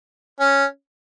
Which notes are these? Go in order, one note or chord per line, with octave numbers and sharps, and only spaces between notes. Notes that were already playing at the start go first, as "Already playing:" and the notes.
C#4